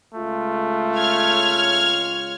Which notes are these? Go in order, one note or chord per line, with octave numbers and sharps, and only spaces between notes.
C#2 G#3 A3 F4
C#5 F6 G#6